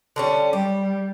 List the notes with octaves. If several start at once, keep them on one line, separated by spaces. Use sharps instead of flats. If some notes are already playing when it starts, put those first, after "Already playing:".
D3 G3 C#4
G3 G4